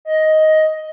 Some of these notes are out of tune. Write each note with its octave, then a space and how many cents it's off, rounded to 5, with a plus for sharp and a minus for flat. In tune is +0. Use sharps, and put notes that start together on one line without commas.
D#5 +10